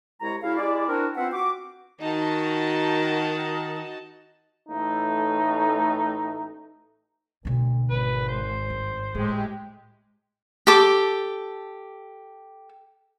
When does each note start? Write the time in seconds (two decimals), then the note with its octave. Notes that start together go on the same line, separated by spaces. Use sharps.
0.21 C2 G#3 E4 C#5 A#5
0.43 C#3 E4 F#4 F5
0.57 G#3 E4 G4 D5
0.88 C4 D4 E4 F#4 A#4
1.17 B3 C4 F4 C5 E5 F#5
1.31 F#4 D6
2.01 D#3 D#4 F#4 A5
4.69 A1 A2 A3 D#4
7.45 D2 B2 D3
7.90 G#1 B4
8.28 C5
8.70 G2
9.15 A2 G#3 A3 G4
10.67 G4 A4 D6